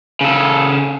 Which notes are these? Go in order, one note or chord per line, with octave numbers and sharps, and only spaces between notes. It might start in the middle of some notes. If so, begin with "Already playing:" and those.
C#3 A4